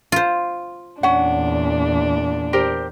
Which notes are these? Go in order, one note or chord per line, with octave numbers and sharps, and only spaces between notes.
F4 C5
E2 A#2 C#4 D4 F#5
G4 A#4 C5